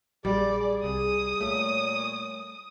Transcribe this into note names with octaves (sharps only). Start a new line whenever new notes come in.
A#1 G3 G#4 D5
C2 D#6
A#2 A3 C#5